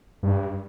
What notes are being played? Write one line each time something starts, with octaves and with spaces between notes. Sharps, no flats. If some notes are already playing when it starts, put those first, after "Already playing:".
G2